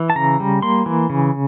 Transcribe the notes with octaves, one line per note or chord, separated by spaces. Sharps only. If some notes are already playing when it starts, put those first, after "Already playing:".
Already playing: E3
A5
C#3 A#5
G3
A#3 C6
E3
C#3